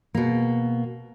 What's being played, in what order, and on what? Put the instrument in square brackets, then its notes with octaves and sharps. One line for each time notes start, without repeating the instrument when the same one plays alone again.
[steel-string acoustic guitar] B2 A#3